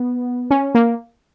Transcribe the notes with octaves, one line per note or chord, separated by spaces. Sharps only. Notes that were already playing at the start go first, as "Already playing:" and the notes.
Already playing: B3
C#4
A#3